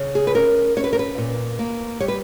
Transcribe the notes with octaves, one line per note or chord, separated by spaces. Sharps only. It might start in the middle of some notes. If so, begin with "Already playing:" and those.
Already playing: C#3
G#4
B4
C#4 A#4
C#4 C#5
B4
A#4
B4
A#2
A#3
G3 C#5
B4